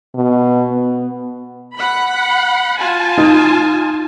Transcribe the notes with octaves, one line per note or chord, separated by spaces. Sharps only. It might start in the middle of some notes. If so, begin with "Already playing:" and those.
B2
B3
F#5 B5
F4 G#5 A5
D#4